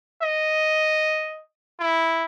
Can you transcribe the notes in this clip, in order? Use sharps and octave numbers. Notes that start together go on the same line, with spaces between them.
D#5
E4